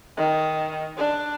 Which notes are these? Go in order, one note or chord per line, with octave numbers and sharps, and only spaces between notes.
D#3
D4